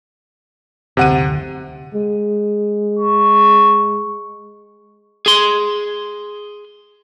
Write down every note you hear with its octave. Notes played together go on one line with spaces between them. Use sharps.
F#1 D2 C3 F#5 D#7
G#3
C#6
G#4 C6